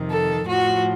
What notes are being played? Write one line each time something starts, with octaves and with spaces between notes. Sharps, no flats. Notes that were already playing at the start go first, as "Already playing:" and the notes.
Already playing: F2 C3 D#3
A4
A2 F3 F#4